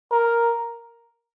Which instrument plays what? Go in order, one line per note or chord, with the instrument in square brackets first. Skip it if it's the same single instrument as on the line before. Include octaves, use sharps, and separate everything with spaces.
[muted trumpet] A#4